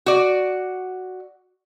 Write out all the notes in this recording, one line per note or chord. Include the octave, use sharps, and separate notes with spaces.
F#4 D5